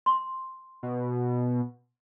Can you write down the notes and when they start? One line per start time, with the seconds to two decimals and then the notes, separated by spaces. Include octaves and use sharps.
0.06 C6
0.83 B2